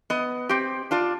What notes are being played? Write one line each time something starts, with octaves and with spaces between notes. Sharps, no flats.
B3 D#5
C4 G4
D4 F4 D5